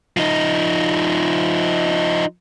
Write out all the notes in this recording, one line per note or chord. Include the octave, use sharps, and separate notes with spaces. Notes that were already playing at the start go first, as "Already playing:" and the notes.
F3 D#4